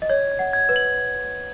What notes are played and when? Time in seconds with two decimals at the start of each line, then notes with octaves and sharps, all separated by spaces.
0.02 D#5
0.09 C#5 G#6
0.31 G#6
0.39 F#5
0.53 G#6
0.69 B4
0.76 F#7